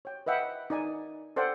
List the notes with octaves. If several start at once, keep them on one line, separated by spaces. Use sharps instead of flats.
C#5 G5
B4 D#5 E5 F#5 G5
D#4 D5 G#5
A4 C5 D5 F#5 G5